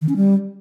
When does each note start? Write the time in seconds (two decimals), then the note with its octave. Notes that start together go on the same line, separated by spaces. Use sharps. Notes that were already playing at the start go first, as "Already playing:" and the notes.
0.02 D#3
0.09 C#4
0.16 G3